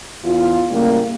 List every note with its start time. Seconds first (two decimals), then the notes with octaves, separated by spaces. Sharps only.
0.24 E2 F4
0.70 A2 C#3 G3 A#3